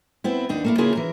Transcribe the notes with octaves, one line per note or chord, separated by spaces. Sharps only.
B3 C4 E4
D#2 D4 D#4
A3 A#3 E4
C#3 A#3 E4 F4 G#4
E3 A#4